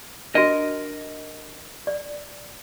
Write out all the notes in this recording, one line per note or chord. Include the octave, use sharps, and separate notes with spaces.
D4 F#4 A#4 D#5
D5